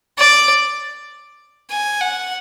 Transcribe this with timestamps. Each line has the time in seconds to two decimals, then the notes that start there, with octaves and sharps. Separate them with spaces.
0.18 D5
1.71 G#5
2.01 F#5